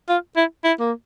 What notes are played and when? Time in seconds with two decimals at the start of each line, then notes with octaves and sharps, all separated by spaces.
0.09 F4
0.36 E4
0.64 E4
0.80 A#3